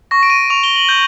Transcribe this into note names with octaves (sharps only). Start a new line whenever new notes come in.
C#6 A#6
D7
D#7
C#6 F7
G7
F#7
G6